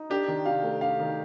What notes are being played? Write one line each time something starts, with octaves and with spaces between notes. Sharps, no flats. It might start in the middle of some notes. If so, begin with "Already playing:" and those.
Already playing: D#4
D4 G4
D#3
C3 F5
A3
D4 F5
D#3